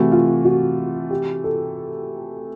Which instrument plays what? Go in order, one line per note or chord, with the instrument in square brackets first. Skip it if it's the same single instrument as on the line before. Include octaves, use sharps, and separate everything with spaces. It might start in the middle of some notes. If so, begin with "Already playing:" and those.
Already playing: [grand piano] C3 E3 A3 [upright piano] F#4
[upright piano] F4
F#4
G4
A4